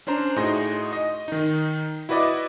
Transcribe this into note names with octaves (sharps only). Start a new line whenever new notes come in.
C#4 D4 C5 A#5
A2 D#4 F#4 G#4 C6 A#6
D#5
D#3 D#4
E4 F#4 B4 D5 D#5 D6